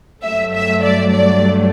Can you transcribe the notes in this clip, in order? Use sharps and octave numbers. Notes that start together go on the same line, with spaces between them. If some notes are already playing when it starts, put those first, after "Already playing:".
G2 F#3 A3 E5
E5
D5
D5